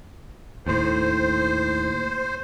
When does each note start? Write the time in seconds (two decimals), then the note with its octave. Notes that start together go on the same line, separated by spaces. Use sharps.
0.66 D#2 A2 C5